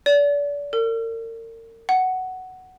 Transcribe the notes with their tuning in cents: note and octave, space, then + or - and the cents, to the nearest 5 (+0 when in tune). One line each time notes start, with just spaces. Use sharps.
D5 -35
A#4 -40
F#5 +10